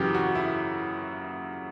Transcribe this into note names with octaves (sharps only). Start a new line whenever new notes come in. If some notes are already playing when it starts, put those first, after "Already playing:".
Already playing: F#2 C#3 E3 F#4 G4
F#4
E4